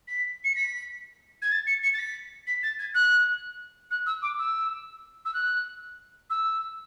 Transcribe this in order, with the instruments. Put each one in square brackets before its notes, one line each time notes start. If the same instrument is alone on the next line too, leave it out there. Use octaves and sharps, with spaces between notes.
[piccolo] B6
C#7
B6
G#6
A6
C#7
C#7
A6
B6
B6
A6
G#6
F#6
F#6
E6
D6
E6
E6
F#6
E6